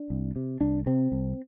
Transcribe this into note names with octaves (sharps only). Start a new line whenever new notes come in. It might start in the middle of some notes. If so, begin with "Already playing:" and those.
Already playing: D4
C2
C3
C2 D4
C3 C4
C2